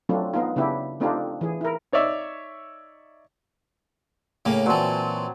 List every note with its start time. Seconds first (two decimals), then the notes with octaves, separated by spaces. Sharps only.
0.09 F#3 A3 C4 D4 F4
0.34 B3 D#4 F4
0.56 C#3 B3 D4 E4 G4
1.00 A3 C4 D4 D#4 F4 G4
1.41 E3 G#4
1.61 E4 A#4
1.92 D#4 C#5 D5 E5
4.45 A2 C#3 A#3
4.66 A#2 E3 F#3 C4 A5